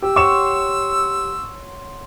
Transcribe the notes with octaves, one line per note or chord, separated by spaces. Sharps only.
G4 E6
C#5 F#5 C6 C#6 E7